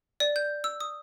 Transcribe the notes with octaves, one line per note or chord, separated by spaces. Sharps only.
D5
G6
E6
D#6